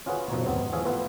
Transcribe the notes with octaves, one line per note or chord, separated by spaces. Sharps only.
C#4 F4 F#4 G#4 B4 C#5
F#2 B2 F3 F#3 D#4 C#5
D#2 G#2 F#3 B3 C4
E3 F3 G#4 C#5 E5 F5
A3 B3 F4 G4 A4 B4